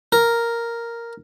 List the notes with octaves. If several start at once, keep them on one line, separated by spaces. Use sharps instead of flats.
A#4